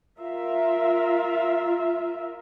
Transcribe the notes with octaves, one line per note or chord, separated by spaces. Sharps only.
F4 A#4 E5